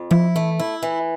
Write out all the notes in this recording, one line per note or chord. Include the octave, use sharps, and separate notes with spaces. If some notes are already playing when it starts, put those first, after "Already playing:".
Already playing: F2
F3 E4
E3 A3
E4
E3